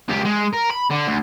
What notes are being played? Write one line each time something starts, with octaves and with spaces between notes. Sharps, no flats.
C#2 G4
G#3
A#4
B5
D3
D2